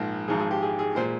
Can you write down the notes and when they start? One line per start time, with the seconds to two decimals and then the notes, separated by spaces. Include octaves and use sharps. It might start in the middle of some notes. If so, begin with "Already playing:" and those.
Already playing: A#1 G#2 F3 G#3 A#4
0.28 G#1 G#2 F3 G#4
0.39 G#4
0.51 G4
0.62 G#4
0.79 G#4
0.95 A#2 G#3 C5